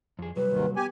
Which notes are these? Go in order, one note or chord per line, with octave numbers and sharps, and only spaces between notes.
F2 G#4
C3 F#3 G3 B4
D#2 G#2 D#3
B3 G4 G#5